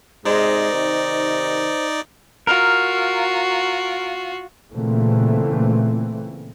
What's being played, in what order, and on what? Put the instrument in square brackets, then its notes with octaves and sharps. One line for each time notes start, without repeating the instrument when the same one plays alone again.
[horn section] G#2 C3 G#3 [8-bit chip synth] D#4 D5 [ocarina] C5
[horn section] C3 D#3
[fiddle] F4 F#4 [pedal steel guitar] A#4
[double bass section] A#2 C#3 E3 A3 C4